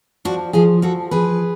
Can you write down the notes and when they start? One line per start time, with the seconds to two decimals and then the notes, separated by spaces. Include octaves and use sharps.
0.25 F3 D4 F#4
0.53 F3 F4 G#4
0.82 F3 F#4 A4
1.11 F3 G#4 B4